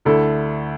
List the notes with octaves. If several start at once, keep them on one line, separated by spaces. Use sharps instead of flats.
D2 D3 A3 E4 A4